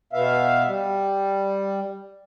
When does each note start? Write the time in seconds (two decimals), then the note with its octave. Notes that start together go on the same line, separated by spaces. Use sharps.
0.13 B2 B3 E5 F5
0.66 G3